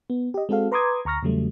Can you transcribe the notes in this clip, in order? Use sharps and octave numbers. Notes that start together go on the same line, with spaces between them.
B3
G4 D#5
G#3 C4 F#4 A4 F5
B4 A#5 C6 D6 D#6 G#6
D2 A#5 C#6 F6 A#6
E2 C#3 F#3 G3 A3